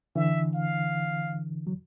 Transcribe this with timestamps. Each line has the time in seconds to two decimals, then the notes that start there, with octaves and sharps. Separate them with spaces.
0.16 D3 E3 E5
0.55 F5
1.67 F#3